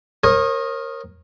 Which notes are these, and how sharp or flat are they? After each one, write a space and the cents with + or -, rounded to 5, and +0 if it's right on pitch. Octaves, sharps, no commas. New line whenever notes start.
A#4 +0 C#5 -40 D#6 +0